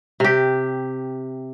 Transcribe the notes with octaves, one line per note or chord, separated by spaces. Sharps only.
C3 G4